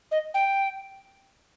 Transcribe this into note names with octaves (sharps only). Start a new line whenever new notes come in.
D#5
G5